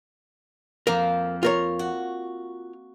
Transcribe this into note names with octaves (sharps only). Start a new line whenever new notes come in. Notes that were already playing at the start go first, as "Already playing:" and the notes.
F2 F3 A#3 A#4
F4 A#4 C#5
F#4